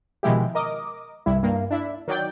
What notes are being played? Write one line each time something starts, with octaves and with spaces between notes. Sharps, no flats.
B2 D#3 F3 G#3 E4 G4
A#4 D#5 D6 D#6
C2 G2 E4
G2 A#3
D4 E4 E5
D#3 F#3 D5 G5 G6